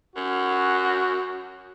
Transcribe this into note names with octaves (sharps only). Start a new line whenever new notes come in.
F#2 C#4 F#4